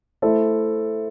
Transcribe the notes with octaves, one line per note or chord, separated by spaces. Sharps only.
A3 E4 A4 C5